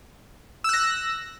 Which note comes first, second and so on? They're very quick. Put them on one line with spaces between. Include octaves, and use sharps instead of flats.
E6 F#6 A#6